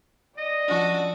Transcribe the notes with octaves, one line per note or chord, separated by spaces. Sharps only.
D5 D#5
F3 C#4 D4 F#4 A4